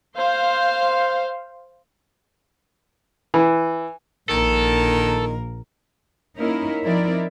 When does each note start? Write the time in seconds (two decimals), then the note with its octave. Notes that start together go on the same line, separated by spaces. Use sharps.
0.17 C5 F5
3.34 E3
4.29 A#1 D#3 A#3 A4 A#4
6.38 A#3 C#4 D#4 E4 A#4
6.83 F3 C4 D#4 E4 A#4 D5